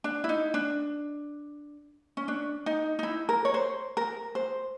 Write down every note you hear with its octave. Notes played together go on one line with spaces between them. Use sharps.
D4
E4
D#4
D4
C#4
D4
D#4
D#4
E4
A#4
C#5
C5
A#4
C5